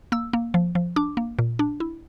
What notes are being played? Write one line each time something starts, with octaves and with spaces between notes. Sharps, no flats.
A#3 E6
A#3
F3
F3
D4 D6
A#3
A#2
D4
E4